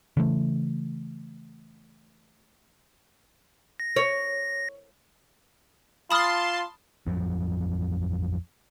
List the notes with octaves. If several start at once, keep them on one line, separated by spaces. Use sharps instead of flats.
C#3 E3 A3
A#6
C#5
F4 A5 B5 C6 D#6 F6
A1 F2 F3 F#3